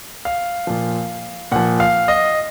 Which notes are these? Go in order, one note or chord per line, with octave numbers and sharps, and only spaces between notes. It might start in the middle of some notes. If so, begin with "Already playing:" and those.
F5
A#2 F3
A#2 F3 F#5
F5
D#5